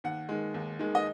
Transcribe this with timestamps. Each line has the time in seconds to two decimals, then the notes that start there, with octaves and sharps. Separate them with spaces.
0.04 D#2 F#5
0.29 D#3 G#3
0.54 D#2
0.79 D#3 G#3
0.95 D#5